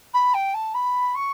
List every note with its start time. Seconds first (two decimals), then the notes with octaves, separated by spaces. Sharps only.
0.14 B5
0.34 G5
0.54 A5
0.74 B5
1.15 C#6